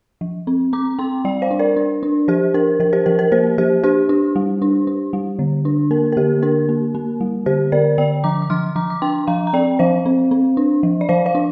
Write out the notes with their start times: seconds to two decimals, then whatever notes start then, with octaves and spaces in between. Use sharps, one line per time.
0.21 F3
0.47 C4
0.73 C4 A#5 D6
0.99 C4 G5 C6
1.25 G3 D5 G5
1.42 C5 F5
1.51 D4
1.59 A#4 D5
1.76 D4
2.03 D4
2.28 F3 G4 C5
2.54 D4 A#4
2.80 F3 A#4
2.93 G4 C5
3.06 F3 A#4
3.19 A#4
3.32 A#3 G4 C5
3.58 F3 G4 C5
3.84 D4 G4 C5
4.09 D4
4.36 G3
4.62 D4
4.87 D4
5.13 G3
5.39 D3
5.65 D4
5.91 A#3 A#4
6.12 A#4
6.17 D3 G4
6.43 D4 A#4
6.69 A#3
6.95 A#3
7.21 G3
7.46 D3 G4 C5
7.72 D3 A#4 D5
7.98 D3 D5 G5
8.24 F3 A#5 D6
8.42 D6
8.50 F3 C6 F6
8.76 F3 A#5 D6
8.90 D6
9.02 D4 G5 C6
9.27 F3 F5 A#5
9.47 A#5
9.53 C4 D5 G5
9.79 F3 C5 F5
10.06 C4
10.31 C4
10.57 D4
10.83 F3
11.01 D5
11.09 F3 C5 F5
11.26 C5 F5
11.35 D4